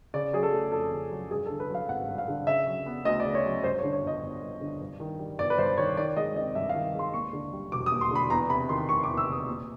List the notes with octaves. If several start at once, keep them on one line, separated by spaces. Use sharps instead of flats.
C#3 D5
F#3 G#4
A4
A3
F2 A4
C#3
F#3
G2 G#4
A4
D3
B4
F#3
F5
G#1 F#5
G2
F5
D3
C#3 E5
F#3
B3
D2 D#5
D5
C#3
C#5
F#3
G2 C5
C#5
D3
C#5
G1 D#5
G1
G2
D3
G2
D#3
G3
G1 D5
B4
G2 C5
D#3 C#5
D#3 D5
G#3 D#5
C4 D#5
G2 E5
F5
D#3
G#3
C6
D#2 C#6
D3
G3
E1 D6
D#6
D#2
C6
D3 B5
E2 A#5
C3 B5
D#3 C6
F1 C#6
D6
E2
E6
C3 D#6
A#2